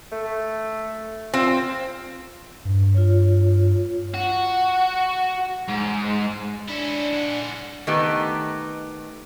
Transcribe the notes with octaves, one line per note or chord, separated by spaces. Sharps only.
A3
C4 F4
G2
F4 C#5
F#4
G#2
C#4 D4 E4
G#3 F#5
D#3 A3 B3 D#4 G4 B4